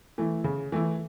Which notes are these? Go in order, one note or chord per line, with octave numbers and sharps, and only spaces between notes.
E3 A3 E4
C#3
E3 A3 E4